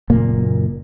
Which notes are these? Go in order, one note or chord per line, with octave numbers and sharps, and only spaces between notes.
F#1 A#2 A#3